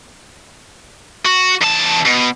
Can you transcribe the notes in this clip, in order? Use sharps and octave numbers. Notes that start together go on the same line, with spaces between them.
F#4
E2 A5
B2